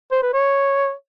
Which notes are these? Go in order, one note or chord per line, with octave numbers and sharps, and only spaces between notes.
C5
B4
C#5